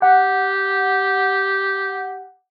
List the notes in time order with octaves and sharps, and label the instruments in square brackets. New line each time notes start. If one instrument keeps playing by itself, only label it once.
[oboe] G4 [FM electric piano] F#5